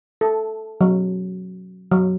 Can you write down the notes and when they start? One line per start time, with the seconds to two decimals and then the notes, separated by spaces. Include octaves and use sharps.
0.21 A4
0.81 F#3
1.92 F#3